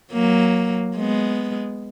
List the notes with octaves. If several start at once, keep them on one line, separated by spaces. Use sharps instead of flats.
F#3 A#3
G#3 B3